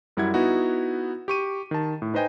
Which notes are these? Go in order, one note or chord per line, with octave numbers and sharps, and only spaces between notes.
F#2 G3 E4 F#5 G#6
B3 D#4 E4 F#4
G4 C#6 D#7
D#3 A5
A2
D#4 B4 C5 D#5 G5 G#5